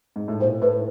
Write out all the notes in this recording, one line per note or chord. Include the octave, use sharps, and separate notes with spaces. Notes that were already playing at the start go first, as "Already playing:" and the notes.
G#2
A2
A#2 C5
A2 B4